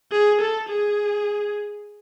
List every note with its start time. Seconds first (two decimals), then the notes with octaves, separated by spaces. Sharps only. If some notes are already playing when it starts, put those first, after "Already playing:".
0.12 G#4
0.41 A4
0.69 G#4